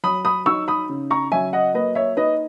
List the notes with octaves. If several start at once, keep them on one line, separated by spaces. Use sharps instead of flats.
F#3 B5 D#6
B5 D#6
D#4 C#6 E6
B5 D#6
C#3
A#5 C#6
F#3 E5 G#5
D#5 F#5
A#3 B4 D#5
C#5 E5
D#4 B4 D#5